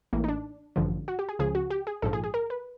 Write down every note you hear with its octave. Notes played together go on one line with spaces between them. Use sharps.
A1 A2 E3 A#3
D#4
D4
A1 G2 D3 F3
F#4
G4
G#4
C#2 C#3 F3 G#4
F#4
G4
G#4
A#1 G#2 F3 A4
G#4
G#4
A#4
B4